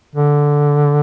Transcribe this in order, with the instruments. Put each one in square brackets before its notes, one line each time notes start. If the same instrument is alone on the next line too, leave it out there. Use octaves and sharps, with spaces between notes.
[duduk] D3